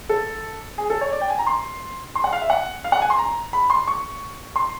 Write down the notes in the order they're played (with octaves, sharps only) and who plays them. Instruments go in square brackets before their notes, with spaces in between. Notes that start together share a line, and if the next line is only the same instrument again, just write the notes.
[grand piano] A4
G#4
A4
C#5
D5
G5
G#5
A#5
C6
C6
F#5
F5
E5
F#5
F5
F#5
G#5
C6
A#5
B5
C6
C#6
C6